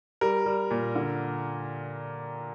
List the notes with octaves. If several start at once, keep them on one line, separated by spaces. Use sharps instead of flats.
G3 A#4
G3
A#2
D3